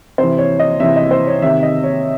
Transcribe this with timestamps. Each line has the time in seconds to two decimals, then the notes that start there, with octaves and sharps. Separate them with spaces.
0.18 C3 E3 C5
0.38 C#5
0.59 D#5
0.80 C3 E3 E5
0.96 D#5
1.11 C5
1.27 C#5
1.42 C3 D#3 E5
1.63 D#5
1.83 C#5